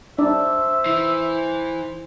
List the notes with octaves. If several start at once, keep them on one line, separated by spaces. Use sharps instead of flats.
D4 C5 D5 E5
E3